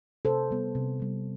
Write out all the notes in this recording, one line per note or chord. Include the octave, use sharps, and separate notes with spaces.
C3 A4 C5
G3 B3
C3
G3 B3